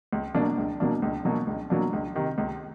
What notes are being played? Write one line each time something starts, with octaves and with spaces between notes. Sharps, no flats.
C#2
B2 F#3 A#3 D4
C#2
B2 F#3 A#3 D4
C#2
B2 F#3 A#3 D4
C#2
B2 F#3 A#3 D4
C#2
C3 D#3
C#2